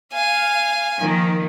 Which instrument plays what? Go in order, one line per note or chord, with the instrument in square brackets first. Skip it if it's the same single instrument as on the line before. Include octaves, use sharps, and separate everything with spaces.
[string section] F5 [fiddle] G#5
[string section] D#3 F3 A#3